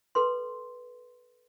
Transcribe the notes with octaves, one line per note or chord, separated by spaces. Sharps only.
A4 B4 C6